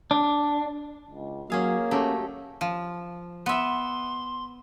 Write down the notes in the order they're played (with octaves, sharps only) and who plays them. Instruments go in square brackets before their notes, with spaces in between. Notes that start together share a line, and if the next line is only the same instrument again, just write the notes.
[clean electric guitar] D4
[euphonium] C#2
[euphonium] F#3 [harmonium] A#3 [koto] C#4 G#4 F5
[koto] F#3 A3 G4 [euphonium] C#4
[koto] F3
[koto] B3 E5 [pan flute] C6